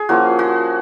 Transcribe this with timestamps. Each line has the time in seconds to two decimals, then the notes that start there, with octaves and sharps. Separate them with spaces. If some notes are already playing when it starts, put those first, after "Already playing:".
Already playing: G#4
0.09 F3 A#3 C#4 E4 F#4
0.39 F#4